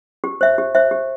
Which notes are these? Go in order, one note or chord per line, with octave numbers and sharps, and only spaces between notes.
G4
C5 E5
G4
C5 E5
G4